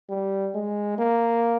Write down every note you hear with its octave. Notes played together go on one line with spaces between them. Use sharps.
G3
G#3
A#3